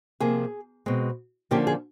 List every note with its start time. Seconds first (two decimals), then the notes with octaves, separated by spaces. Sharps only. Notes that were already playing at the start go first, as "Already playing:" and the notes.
0.20 C3 F3 A#3 G#4
0.86 B2 G#3 C4
1.51 D3 F3 A#3 C#4 G4
1.67 G#4